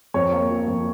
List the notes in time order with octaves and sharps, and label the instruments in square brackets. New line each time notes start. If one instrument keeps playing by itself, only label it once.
[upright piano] F2 C#5
A#3
F3
F2